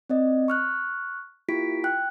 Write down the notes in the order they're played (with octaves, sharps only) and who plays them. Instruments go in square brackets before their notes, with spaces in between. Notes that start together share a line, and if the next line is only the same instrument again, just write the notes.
[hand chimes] C4 D5 D#5
C#6 F6 F#6
A#3 E4 F4 G4 B6 D7
G5 F#6